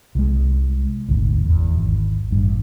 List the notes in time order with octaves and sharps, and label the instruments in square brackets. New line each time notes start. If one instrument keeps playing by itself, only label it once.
[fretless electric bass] C2 G#3
D#1 G#1 D2
E2
G#1
A1 G2